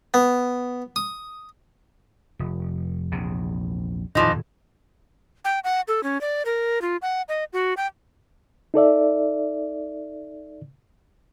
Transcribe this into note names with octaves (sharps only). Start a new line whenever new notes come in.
B3
D#6
F1
A#1 E2 C3
D#1 F2 A2 E3 F3 D#4
G5
F#5
A4
C#4
D5
A#4
F4
F#5
D#5
F#4
G5
D#4 A4 D5 E5